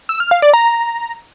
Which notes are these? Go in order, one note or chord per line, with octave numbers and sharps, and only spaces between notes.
E6
F6
F5
D5
A#5